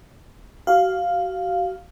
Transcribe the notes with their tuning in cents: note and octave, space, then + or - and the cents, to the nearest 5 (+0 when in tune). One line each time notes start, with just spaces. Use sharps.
F#4 +35 F5 +0